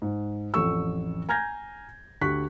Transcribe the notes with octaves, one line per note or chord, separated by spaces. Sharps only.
G#2
A1 F2 A4 C#6 E6
G#5 A#5 F6 G6 G#6 A#6
D2 G4 C#6 F#6 B6